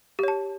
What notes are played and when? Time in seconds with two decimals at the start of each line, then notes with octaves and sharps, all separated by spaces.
0.19 G4
0.23 C#5
0.28 A5